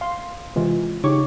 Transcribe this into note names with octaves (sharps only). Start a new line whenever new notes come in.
F5 C6
C3 E3 G#3 F4
C#3 D#4 G4 C#5 C#6 D6